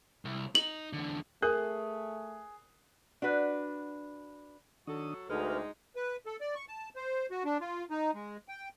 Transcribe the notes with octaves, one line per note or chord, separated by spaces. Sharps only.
C2
D#4 F#7
E2 D3
A3 G#4 A#4 D#6 F#6
D4 F#4 B4
D#3 F#3 D4 F#4 A4 D#6
D2 G#3 D#4 B4 F6
B4
A4
D5
C#6
A5
C5
F#4
D4
F4
D#4
G#3
G5